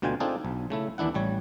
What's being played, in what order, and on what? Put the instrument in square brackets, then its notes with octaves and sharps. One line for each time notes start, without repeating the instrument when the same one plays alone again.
[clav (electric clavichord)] D2 B2 D3 F4 G5 G#5
C4 D4 D#4 F4 G#4 A4
B1
C#3 A3 E4
D#2 E3 D4 E4 F#5
A1 G3 C#5